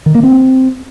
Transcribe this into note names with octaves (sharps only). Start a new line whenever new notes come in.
D#3
A#3
C4